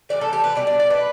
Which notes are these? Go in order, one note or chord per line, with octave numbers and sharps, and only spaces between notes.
A2 E3 G3 D5
A4
G4
B4
B2 G3 D5
D5
D5
B4